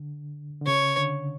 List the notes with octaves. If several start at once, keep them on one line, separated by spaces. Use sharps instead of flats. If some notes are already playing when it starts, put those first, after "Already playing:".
Already playing: D3
D3
C#3 C#5
D3